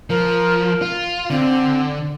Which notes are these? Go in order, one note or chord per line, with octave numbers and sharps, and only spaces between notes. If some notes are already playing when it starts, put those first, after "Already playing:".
F3 A#4
F4
D3 C4